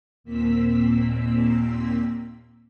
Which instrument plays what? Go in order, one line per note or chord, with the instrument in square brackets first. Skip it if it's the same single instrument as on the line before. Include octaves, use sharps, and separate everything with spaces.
[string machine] D#2 A#2 A#3 C4 E6 B6